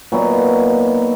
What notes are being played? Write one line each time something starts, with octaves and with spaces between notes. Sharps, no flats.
A#2 F#3 B3 D#4